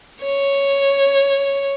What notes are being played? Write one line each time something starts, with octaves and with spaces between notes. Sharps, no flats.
C#5